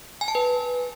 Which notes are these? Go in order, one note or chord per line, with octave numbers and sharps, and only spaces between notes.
G#5
A5
B4